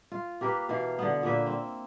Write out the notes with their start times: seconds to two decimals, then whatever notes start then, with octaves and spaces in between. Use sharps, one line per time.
0.12 F4
0.41 A#3 G4 A#4 B4
0.69 B2 E3 A#4 F5
0.99 D3 B3
1.23 A#2 A#3 B4 E5
1.46 C4